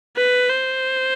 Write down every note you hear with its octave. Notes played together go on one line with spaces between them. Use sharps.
B4
C5